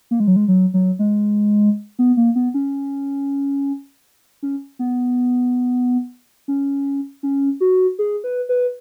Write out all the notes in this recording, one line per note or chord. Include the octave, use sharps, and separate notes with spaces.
A#3
G#3
F#3
G#3
F#3
F#3
G#3
B3
A#3
B3
C#4
C#4
B3
C#4
C#4
F#4
G#4
B4
B4